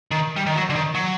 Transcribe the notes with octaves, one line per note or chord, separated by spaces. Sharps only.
D#3
G3
D#3
F#3
D3
D#3
F#3